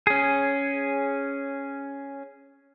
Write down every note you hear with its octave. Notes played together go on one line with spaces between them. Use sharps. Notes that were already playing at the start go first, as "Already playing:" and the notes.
C#4 G#4